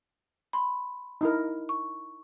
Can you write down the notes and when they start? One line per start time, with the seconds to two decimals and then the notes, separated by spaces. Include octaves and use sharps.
0.53 B5 C6
1.21 D#4 E4 A#4
1.69 C#6